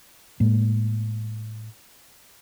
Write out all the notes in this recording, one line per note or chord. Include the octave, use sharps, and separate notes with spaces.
A2 G#3 A#3